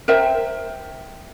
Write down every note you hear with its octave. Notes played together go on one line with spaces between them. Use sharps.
A#4 C5 E5 G5